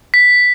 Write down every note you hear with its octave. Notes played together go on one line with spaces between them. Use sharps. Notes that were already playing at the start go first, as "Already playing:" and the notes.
B6